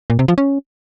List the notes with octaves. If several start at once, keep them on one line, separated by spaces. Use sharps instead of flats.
A#2
C3
F3
C#4